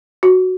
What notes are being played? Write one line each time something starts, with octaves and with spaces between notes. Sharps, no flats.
F#4